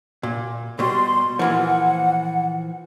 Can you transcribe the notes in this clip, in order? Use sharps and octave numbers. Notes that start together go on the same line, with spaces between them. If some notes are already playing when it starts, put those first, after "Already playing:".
A#2
B2 G3 C6
A#2 E3 F3 F#5